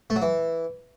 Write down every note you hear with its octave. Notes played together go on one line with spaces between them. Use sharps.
A3
F#3
E3